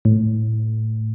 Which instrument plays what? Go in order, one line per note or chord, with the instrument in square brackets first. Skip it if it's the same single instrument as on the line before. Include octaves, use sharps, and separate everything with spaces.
[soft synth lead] A2